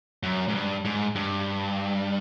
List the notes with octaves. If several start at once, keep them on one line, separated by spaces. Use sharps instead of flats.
F#2
G#2
G2
G#2
G2